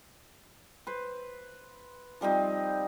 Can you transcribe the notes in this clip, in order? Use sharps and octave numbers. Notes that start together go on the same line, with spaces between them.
B4 C5
F3 G3 C4 D#4